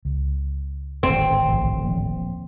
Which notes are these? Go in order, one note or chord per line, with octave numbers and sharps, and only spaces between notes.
C#2
D1 G#1 A2 C4
B1 E3 F3
D#1 F3 A#3